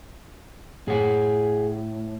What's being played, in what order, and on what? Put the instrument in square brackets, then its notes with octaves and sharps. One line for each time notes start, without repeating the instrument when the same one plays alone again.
[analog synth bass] A2 [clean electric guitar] G#4 F#5